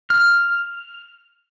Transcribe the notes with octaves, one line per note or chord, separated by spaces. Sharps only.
F6